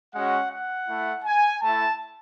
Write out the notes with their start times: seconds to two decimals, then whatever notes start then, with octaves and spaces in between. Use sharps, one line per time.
0.15 G#3 C#4 F#4 F#5
0.52 F#5
0.88 A3 E4
1.25 G#5
1.62 A3 E4 A5